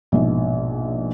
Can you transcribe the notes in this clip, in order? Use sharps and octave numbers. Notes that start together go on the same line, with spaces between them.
A#1 G#2 B2